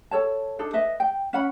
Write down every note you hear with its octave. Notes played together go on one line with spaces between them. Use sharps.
A4 C#5 A5
D4 D#4 A4
B4 D#5 E5
G5
C#4 F#5 B5